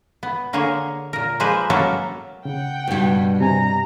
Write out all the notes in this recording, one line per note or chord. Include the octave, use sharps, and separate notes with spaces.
B3
D3 A#3 G#4 C#5
A#2 A#4
F3 G#3 A#3 G#4 B4 C5
F#3 A#3 B3 C#4 A4 C#5
C#3 F#5 G5
G2 B2
C3 G#5 A#5